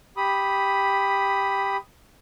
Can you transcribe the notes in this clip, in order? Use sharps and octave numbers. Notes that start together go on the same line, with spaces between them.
G4 B5 D#6